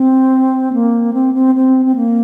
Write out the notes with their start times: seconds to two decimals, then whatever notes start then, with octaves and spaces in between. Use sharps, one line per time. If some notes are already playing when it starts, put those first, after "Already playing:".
Already playing: C4
0.73 A#3
1.13 C4
1.34 C4
1.55 C4
1.86 C4
1.96 A#3